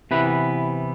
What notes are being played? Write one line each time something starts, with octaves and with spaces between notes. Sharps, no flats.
C3 E3 B3 E4 B4